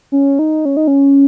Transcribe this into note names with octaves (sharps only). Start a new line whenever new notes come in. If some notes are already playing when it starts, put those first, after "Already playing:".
C#4
D#4
C#4
D#4
C#4